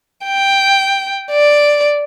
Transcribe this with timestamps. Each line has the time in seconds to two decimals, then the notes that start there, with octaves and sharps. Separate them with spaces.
0.25 G5
1.31 D5